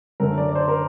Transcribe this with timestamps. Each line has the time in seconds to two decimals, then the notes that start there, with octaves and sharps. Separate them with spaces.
0.20 F#2 D3 A3 A#4
0.38 D5
0.49 D5
0.55 C5
0.68 A#4